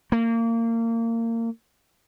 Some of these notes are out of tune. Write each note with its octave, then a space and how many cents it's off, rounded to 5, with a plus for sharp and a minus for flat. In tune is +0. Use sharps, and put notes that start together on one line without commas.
A#3 -25